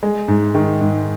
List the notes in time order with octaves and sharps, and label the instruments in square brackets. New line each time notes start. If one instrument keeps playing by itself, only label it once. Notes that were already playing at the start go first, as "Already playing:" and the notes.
[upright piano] G#3
G#2
D#3
G#2